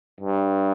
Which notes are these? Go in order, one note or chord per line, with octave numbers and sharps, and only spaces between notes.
G2